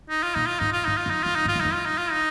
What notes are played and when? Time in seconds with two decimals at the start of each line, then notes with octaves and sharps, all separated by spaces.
0.09 D#4
0.23 F4
0.35 A#2 D#4
0.47 F4
0.59 G#2 D#4
0.73 F4
0.85 G#2 D#4
0.97 F4
1.06 F#2
1.10 D#4
1.23 F#2 F4
1.36 D#4
1.45 G#2
1.48 F4
1.56 F#2
1.61 F2 D#4
1.73 F4
1.86 D#4
1.98 F4
2.11 D#4